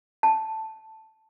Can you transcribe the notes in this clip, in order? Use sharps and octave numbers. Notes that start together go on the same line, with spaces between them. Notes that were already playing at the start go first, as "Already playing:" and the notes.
A5